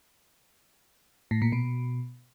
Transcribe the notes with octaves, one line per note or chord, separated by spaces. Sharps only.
A2
A#2
B2